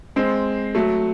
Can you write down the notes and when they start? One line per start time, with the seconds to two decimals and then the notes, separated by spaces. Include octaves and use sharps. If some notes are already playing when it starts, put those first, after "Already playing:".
0.16 G#3 C4
0.75 F#3 A3